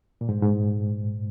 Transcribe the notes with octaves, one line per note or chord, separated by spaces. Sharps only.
A#2
G#2
G#2